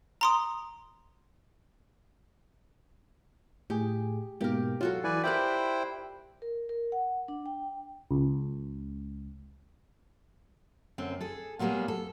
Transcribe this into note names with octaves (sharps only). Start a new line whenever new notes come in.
A#5 C6 D#6
A2 G4 G#4
G#2 B2 A#3 G4 A#4
F#3 F4 F#4 A4
E3 B4 D5 G#5
E4 G4 A#4 C5 D5 G5 B5 F#6
A#4
A#4
F#5
D4
G5
C#2
F#2 D3 C4
G#4 A4
A#2 F#3 G3 A#3 B3 G#4
A4